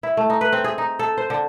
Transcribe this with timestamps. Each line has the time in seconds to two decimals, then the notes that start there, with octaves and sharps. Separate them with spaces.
0.03 E4
0.17 A3
0.30 D#4
0.41 B4
0.52 C4
0.64 G#4
0.78 D#4
0.99 A4
1.17 C5
1.30 D3